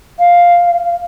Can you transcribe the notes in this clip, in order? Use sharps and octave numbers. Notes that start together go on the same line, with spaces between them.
F5